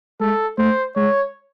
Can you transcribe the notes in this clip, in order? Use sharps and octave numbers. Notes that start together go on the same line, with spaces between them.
G#3 A4
A3 C5
G#3 C#5